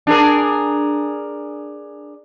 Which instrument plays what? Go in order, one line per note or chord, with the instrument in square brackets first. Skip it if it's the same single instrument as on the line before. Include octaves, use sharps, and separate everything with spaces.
[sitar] D4 G#4 A#4